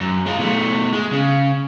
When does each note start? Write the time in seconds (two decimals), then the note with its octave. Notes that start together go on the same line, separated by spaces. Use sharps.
0.01 F#2
0.26 G#3 F4
0.39 B2 A3
0.93 G#3
1.12 C#3